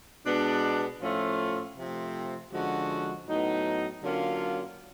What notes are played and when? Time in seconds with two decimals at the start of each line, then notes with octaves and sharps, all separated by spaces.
0.25 B2 G#3 B3 D4
1.01 A2 F3 A3 C#4 F4
1.76 C3 F3 A3 C4
2.51 D3 F3 G#3 C#4 F#4
3.27 A2 F#3 B3 D#4
4.02 D3 F#3 A#3 C#4 F4